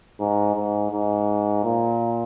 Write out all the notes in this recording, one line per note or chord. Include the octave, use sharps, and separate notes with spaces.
G#2
G#2
G#2
A#2